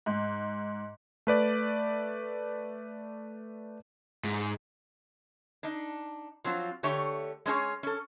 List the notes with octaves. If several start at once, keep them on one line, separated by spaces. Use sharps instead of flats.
G#2
A3 B4 D5
G#2
D4 D#4
F3 F#3 C4 F4
D3 A3 G4 C#5
G#3 C#4 D4 G#4 C#5
C#4 A4